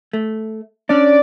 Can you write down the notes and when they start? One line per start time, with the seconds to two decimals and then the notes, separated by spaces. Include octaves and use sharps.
0.13 A3
0.89 C#4 D4 D5